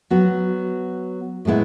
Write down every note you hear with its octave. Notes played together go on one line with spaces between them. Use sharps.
F#3 B3 F#4
A2 G#3 B3 E4